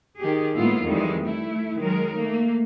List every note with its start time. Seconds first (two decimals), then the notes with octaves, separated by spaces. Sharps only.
0.19 D#3 G4 G#4
0.57 A2 G#3 A#3 B3 E4 F4
0.85 F2 D#3 E3 G3 G#3
1.23 A3 E4
1.79 D#3 F#3 G#3 A#4
2.15 A3 A#3